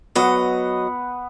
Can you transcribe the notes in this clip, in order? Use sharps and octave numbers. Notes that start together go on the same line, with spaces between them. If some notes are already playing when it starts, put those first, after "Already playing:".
F#3 B3 D#5 F#5